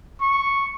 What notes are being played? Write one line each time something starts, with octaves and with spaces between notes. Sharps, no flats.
C#6